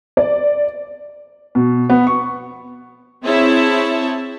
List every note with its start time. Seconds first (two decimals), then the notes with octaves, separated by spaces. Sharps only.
0.17 D5
1.55 B2
1.90 B3
2.07 C#6
3.24 C4 E4 G#4 C#5 E5 A5